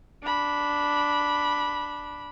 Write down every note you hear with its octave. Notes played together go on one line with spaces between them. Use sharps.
D4 B5